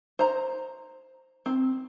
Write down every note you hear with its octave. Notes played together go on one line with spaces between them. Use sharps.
C5 A#5
C4